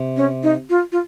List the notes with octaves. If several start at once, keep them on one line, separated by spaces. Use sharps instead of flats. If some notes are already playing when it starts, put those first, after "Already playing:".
Already playing: C3
C#4
D#4
F4
F4